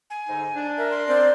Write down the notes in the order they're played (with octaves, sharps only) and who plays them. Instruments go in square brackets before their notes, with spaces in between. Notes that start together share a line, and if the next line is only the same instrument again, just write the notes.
[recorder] G#5
[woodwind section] G#2 D3 D#4
D4
[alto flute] A#4 [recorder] E5
[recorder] C6
[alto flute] C4 [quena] D5